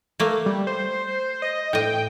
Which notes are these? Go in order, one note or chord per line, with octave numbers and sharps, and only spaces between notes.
A3 A#3
G3
C5
D#5
A2 D#5 G5